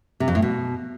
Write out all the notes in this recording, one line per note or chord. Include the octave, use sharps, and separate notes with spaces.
C3
F2
A2
B2